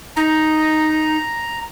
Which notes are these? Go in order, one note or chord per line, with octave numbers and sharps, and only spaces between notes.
D#4 A#5